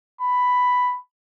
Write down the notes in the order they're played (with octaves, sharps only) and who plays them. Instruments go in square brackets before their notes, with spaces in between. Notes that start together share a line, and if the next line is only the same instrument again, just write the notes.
[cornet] B5